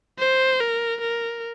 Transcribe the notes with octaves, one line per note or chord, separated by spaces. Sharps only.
C5
A#4
A#4